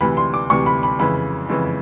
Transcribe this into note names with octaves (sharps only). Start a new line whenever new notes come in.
D2 C3 E3 B5
C6
D6
D2 C3 E3 C#6
B5
B5
F2 C#3 E3 B5
F2 C#3 E3